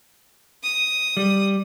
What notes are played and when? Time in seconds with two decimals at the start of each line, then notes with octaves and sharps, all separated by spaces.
0.63 D#6
1.17 G3